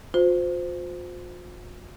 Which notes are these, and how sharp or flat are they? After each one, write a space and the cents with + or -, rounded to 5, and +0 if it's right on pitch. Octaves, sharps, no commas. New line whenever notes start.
F4 +40 C5 -15